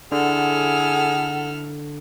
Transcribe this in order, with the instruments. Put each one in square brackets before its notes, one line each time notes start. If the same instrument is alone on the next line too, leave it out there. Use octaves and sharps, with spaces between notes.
[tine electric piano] D3 [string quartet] E4 A4 F6 [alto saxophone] G#4 [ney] F#5